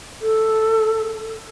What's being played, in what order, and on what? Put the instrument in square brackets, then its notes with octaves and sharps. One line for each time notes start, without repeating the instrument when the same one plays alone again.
[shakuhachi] A4